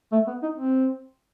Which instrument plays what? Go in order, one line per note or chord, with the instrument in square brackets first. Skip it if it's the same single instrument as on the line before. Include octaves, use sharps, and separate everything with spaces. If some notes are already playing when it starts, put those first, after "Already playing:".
[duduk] A3
B3
D#4
C4